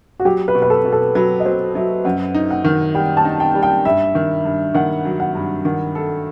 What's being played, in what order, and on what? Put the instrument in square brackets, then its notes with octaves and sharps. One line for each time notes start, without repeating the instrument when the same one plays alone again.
[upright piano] F#4
[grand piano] F#3 [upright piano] G4
[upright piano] B4
[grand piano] B2
[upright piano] B4
A4
[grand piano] B2
[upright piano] A4
[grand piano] F#3 [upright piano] B4
[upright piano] D#5
[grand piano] F#3 [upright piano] C5
[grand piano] F#3 [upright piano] E5
[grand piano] F#2 [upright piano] F#5
[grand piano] D#4
[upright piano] F#5
[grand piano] D#3
[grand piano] G3 [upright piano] G5
[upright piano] A5
[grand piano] D#4
[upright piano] G5
[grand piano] G3
[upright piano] G5
[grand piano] G2 [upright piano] E5
[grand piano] D#3
G2
[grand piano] D#3 [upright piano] F#5
[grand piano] F#3
[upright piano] F#5
[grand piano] G2
D#3
A4